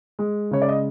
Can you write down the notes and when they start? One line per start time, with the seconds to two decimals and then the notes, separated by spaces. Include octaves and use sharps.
0.19 G#3
0.51 C#3 C#5
0.62 D5
0.69 D#5